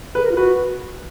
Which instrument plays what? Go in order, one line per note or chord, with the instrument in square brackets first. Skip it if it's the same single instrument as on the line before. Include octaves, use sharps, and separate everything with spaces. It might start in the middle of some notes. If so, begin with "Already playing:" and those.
[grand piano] B4
[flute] G#4
A#4
F4
[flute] F#4 [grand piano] B4